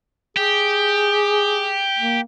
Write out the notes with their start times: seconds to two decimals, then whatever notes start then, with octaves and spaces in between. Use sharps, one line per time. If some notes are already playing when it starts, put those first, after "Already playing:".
0.37 G4 G#4
1.99 A#3